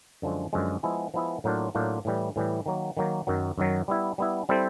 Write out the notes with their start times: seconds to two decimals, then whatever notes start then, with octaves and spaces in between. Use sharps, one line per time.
0.22 F#2 D3 F3 G#3
0.53 F#2 D3 F3 G#3
0.83 F3 G#3 B3 E4 G#4
1.14 F3 G#3 B3 E4 G#4
1.44 A2 F#3 A#3 D4 F4
1.75 A2 F#3 A#3 D4 F4
2.05 A2 E3 G3
2.36 A2 E3 G3
2.66 D#3 F#3 A#3
2.97 D#3 F#3 A#3
3.27 F#2 D#3 F#3
3.58 F#2 D#3 F#3
3.88 G3 B3 E4
4.18 G3 B3 E4
4.49 G3 C4 E4 A4 C5